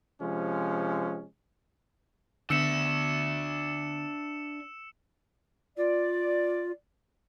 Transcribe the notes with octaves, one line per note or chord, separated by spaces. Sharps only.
C3 F3 G#3 C#4
D3 B3 D4 E5 E6 C#7 E7
F4 D5